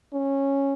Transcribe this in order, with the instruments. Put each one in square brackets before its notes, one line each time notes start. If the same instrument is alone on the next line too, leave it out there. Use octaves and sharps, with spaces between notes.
[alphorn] C#4